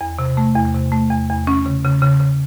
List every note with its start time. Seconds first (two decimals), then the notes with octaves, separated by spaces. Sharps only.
0.01 E2
0.19 C3
0.37 A3
0.55 E2
0.74 C3
0.92 A3
1.10 E2
1.30 E2
1.47 C#4
1.66 C#3
1.85 C#3
2.02 C#3
2.20 C#3